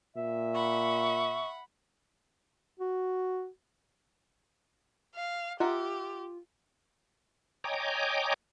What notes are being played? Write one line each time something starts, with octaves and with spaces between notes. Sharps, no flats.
A#2 E5
F#5 B5 C#6
F#4
F5
F4 G4 A#4 E5 F#5
C#5 D#5 G5 G#5 A#5 D6